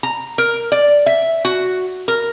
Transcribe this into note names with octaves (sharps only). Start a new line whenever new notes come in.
A#5
A#4
D5
E5
F#4
A#4